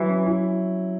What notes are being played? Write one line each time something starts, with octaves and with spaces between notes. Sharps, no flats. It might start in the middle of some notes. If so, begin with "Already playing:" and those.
Already playing: E3 F#3
C#4
E4